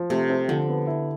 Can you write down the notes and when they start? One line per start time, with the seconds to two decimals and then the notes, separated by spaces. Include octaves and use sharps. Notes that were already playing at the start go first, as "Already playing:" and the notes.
Already playing: F3
0.10 C3 A3
0.30 C4
0.48 D3 F3
0.68 B3
0.87 E4